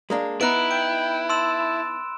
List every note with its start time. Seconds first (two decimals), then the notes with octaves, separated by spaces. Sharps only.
0.10 G#3 A#3 D4
0.41 B3 D#4 E4 B5 F#6 D7
0.71 G5 D7
1.30 A5 C6 E6 E7